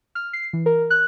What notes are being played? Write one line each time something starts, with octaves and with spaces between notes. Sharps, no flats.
F6
C7
E3
A#4
F#6